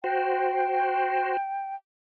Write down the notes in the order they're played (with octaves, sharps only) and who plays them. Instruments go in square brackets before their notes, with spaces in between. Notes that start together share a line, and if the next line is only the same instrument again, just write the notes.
[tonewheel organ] F#4 C5 [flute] G5